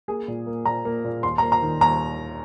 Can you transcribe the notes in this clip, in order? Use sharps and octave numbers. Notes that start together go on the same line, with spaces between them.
A#3 G#4
A#2
A#3
A#2 A#5
A#3
A#2
D#2 C6
A#3 A#5
A#5
D#3
D#2 A#5